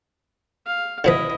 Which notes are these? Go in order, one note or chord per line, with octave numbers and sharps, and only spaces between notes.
F5
D3 F3 E4 B4 D#5